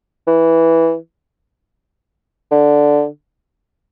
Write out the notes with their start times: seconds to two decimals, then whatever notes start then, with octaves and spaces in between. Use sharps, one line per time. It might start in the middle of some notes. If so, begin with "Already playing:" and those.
0.28 E3
2.52 D3